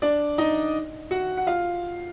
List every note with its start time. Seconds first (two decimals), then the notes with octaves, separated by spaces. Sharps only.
0.02 D4 D5
0.38 D#4 D#5
1.11 F#4 F#5
1.37 F#5
1.47 F4 F5